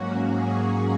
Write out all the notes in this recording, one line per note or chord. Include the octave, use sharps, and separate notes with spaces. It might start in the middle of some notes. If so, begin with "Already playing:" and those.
Already playing: G#2 F#3 A#3 C#4 F#4
G#4